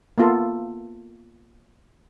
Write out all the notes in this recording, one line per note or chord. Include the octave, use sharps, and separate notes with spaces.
A#3 B3 F4 A4